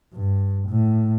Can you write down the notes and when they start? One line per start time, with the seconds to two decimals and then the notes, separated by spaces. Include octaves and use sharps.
0.14 G2
0.68 A2